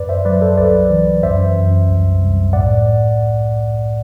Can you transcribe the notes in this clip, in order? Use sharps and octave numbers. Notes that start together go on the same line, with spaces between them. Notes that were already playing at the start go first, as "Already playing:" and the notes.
Already playing: F#2 B4 D5
C5 E5
F#3 B4 D5
A4 C5
C2 B4 D5
E3
F#2 C5 E5
F#2
C2
C2
A2 D5 F#5